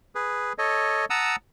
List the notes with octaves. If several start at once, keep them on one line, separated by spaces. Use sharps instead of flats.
G#4 B4
A4 C#5 D#5
F#5 A5 A#5 D#6 E6